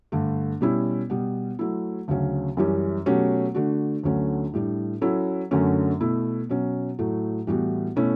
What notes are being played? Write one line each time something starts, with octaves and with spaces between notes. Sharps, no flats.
G2 D3 A3
B2 G3 C#4 E4
B2 G3 B3
F#3 A3 E4
D2 C#3 F#3 C#4
F#2 E3 G3 C#4 G4
B2 F#3 A3 C#4 G4
D3 A3 D4 F#4
D2 D3 F#3 A3 C#4
A2 G3 D4
F#3 C#4 E4 A4
F#2 D3 F#3 A3 C#4
B2 A3 E4
B2 F#3 C#4
A2 F#3 A3
A2 E3 G3 B3 F#4
B2 A3 C#4 E4